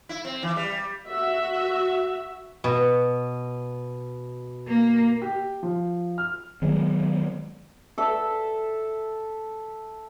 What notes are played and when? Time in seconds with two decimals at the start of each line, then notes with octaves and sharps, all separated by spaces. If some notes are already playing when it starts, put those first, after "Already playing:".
0.09 E4
0.25 C4
0.43 E3
0.56 G3
1.08 F#4 E5
2.64 B2
4.68 A#3
5.22 G4
5.63 F3
6.18 F6
6.62 D#3 F#3 G#3 B3
7.98 A4 E5